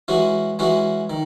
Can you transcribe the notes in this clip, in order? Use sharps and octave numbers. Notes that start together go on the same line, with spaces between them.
E3 G#3 C#4 F#4
E3 G#3 C#4 F#4
D#3